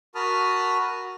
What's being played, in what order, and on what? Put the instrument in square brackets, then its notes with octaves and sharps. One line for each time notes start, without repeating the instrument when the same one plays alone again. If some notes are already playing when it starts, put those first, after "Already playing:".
[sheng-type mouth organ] F#4 A#4 A5 B5 D#6 F6